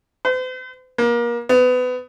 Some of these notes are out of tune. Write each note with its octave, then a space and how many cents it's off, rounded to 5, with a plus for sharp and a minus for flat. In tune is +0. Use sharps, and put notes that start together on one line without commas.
C5 -45
A#3 +30
B3 +25